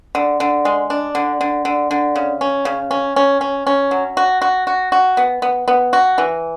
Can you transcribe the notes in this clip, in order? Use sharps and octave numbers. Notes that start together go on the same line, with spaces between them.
D3
D3
G#3
D4
D3
D3
D3
D3
C#3
C#4
C#3
C#4
C#4
C#4
C#4
F#3
F#4
F#4
F#4
F#4
B3
B3
B3
F#4
E3